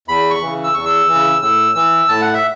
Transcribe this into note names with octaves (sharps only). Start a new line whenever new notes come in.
E2 B5
C#6
C#3 E3
E6
E2 C#6
E6
E3
C#3
A2 E6
E3 E6
A2 A5
F#5
E5